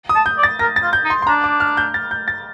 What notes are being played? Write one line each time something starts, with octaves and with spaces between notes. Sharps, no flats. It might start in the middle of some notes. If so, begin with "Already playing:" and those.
D#6
A5
G6
D5
A6
A#4 A#6
A6
F4
G6
D#4
C6
C6
D4 A#5
D6
F6
G6
A6
G6
A6